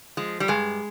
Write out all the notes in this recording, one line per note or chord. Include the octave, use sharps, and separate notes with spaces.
F3 G#3
G3
G2 G#3